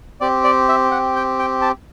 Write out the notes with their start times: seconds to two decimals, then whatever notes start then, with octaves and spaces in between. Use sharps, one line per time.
0.21 C4 G4 D5
0.44 D5
0.68 E5
0.91 F#5
1.16 G5
1.39 G5
1.61 A5